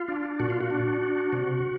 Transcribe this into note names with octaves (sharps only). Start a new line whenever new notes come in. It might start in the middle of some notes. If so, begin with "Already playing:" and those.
Already playing: F4
D4
A#2 F#4
F4
F#4
D4
D4
C3